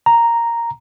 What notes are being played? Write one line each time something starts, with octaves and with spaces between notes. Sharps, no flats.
A#5